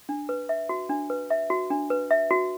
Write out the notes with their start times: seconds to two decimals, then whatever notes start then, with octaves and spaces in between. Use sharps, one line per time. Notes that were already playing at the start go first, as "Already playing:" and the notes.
0.09 D4
0.29 B4
0.49 E5
0.69 F#4
0.89 D4
1.10 B4
1.30 E5
1.50 F#4
1.70 D4
1.90 B4
2.11 E5
2.31 F#4